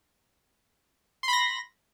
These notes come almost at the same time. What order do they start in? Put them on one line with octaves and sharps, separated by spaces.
C6 B5 A#6